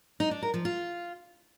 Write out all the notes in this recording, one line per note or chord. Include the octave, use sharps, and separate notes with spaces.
D#4
D4
A#4
F3
F4